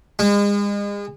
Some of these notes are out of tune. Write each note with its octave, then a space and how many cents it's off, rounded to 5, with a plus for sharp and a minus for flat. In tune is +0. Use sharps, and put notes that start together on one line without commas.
G#3 -35